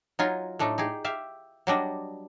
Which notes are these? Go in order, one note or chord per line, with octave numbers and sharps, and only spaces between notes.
F#3 D#4 F4 G#5
A2 A3 D4 D#4
D#4 G4 G#4
G4 E5 F5
F#3 G3 D4 D#5